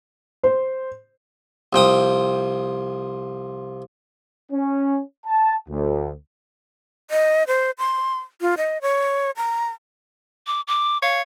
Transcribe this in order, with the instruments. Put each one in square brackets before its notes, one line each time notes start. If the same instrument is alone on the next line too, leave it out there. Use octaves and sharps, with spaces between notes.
[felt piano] C5
[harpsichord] C2 F3 G5 D#6
[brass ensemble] C#4
A5
D2
[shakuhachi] D#5
C5
C6
F4
D#5
C#5
A#5
[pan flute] D6
D6
[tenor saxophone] C#5 [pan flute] F5